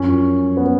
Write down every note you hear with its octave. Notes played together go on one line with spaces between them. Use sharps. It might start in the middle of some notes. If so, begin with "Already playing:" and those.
Already playing: F#2 F3 C#4
B3